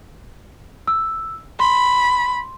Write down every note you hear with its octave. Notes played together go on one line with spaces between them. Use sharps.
E6
B5 C6